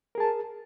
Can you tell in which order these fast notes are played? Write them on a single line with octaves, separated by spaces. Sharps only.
A#4 G#4 A5